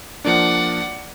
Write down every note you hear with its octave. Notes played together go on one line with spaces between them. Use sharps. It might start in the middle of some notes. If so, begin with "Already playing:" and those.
F3 A#3 D4 D5 F#5